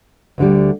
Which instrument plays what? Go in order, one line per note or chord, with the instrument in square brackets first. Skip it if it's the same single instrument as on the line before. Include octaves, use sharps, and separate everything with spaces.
[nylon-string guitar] D2 D3 G3